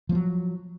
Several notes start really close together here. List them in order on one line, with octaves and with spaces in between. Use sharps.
F3 A3 F#3